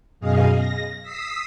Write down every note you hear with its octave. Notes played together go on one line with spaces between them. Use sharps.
F#2 B2 G#4 D#5 F5
A#6
D#6 E6 B6 C7